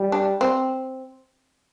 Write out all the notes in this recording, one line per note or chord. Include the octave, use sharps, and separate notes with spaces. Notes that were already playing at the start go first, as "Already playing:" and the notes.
Already playing: G3
D4
C4